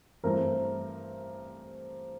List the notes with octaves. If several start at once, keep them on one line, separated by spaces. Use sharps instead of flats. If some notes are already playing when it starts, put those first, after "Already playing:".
G2 E3 A3 C4 A#4